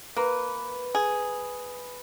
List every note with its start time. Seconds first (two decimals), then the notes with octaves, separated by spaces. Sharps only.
0.16 A#3 B4
0.95 G#4